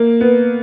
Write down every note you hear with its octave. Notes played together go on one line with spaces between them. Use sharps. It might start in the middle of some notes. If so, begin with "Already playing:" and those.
Already playing: A#3
B3